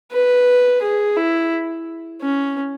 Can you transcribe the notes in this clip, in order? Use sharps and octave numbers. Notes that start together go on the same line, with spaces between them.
B4
G#4
E4
C#4